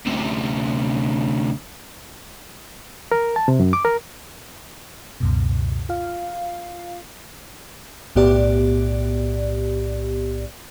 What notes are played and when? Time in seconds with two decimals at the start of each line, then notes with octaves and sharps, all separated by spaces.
0.06 D2 C3
3.12 A#4
3.36 A5
3.48 C3
3.60 F#2
3.73 D6
3.85 A#4
5.20 C#2 F#2 B2
5.89 F4 F5
8.15 B1 A2 B3 G4 D5